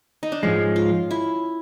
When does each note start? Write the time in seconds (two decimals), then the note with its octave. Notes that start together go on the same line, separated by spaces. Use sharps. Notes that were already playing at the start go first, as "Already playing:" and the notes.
0.23 D#4
0.32 D4
0.43 G#2 F3 G#3 C#4
0.76 F4
1.11 E4